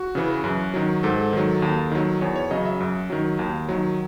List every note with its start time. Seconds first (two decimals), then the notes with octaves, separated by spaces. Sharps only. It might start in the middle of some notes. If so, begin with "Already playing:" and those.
Already playing: F#4
0.15 C#3 E3
0.44 F#2
0.74 D#3 F#3
1.03 G#2 A4
1.33 D#3 F#3
1.62 D#2
1.92 D#3 F#3
2.21 E2 C#5
2.36 C#5
2.51 C#3 F#3 D#5
2.66 E5
2.80 F#2
3.10 D#3 F#3
3.39 D#2
3.69 D#3 F#3